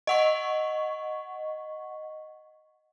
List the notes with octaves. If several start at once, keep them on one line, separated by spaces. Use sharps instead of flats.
D#5 F#5 C#6